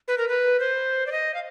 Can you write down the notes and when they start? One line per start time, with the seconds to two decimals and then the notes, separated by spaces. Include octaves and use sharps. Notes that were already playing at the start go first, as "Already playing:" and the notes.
0.08 B4
0.18 A#4
0.29 B4
0.60 C5
1.07 D5
1.12 D#5
1.34 F5